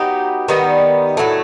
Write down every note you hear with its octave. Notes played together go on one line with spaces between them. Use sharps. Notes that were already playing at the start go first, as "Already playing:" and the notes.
Already playing: F#3 B3 D#4 G4
D#3 G3 B3 D#4
A2 F#3 A3